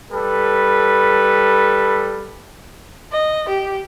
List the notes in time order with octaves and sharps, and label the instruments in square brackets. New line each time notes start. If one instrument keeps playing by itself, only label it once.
[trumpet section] G3 A4 B4
[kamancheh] D#5
G4